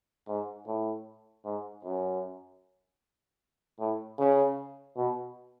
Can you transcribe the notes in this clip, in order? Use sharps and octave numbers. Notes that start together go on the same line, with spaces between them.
G#2
A2
G#2
F#2
A2
C#3
B2